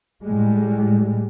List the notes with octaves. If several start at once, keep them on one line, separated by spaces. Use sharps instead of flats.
A2 G3 G#3